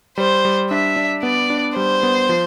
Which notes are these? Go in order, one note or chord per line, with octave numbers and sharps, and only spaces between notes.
G3 C5
G3
D4 E5
D4
B3 D5
D4
G3 C5
B3
F3